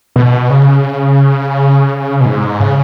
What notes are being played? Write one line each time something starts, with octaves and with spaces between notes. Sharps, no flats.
B2
C#3
B2
G#2
C#3